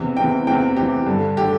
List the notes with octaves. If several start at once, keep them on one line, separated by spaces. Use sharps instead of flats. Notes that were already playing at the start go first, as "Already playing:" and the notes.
Already playing: E2 C3 E3
E2 C3 E3 G5
E2 C3 E3 G5
E2 C3 E3 G4
G2 D3
D3 G4